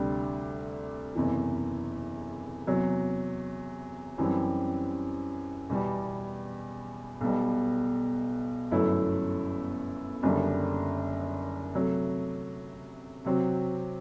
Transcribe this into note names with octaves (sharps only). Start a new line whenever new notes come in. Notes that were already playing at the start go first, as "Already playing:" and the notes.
Already playing: D2 C3 G3 D4 G4
F#1 E2 C3 E3
E2 C3 F#3
F#2 E3 G3 C4 G4
E2 B2 G3
B1 B2 G3
G1 F#2 F#3 A3 E4
F#1 F#2 D3 G3 D4
C3 F#3 A3
C3 F#3 C4 F#4